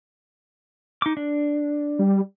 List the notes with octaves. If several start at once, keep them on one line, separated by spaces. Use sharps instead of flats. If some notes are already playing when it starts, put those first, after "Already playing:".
D#4 D6
D4
G3